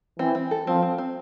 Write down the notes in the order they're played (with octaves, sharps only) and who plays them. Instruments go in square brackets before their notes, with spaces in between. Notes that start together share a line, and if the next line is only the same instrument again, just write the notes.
[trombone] E3 [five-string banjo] C4
[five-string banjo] C4
A4
[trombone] F3 [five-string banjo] C4
[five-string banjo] C4
C4